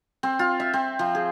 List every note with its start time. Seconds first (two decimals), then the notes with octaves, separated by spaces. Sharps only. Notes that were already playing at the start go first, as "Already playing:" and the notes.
0.23 C4
0.39 F4
0.60 E5
0.73 C4
0.99 F3
1.15 G#4